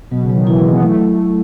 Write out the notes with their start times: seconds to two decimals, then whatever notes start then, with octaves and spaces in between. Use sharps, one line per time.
0.11 B2 F#3
0.23 C#3
0.29 F#3
0.35 D#3
0.47 E3 E4
0.59 G#3
0.65 F#3
0.71 B3
0.82 F#3 A3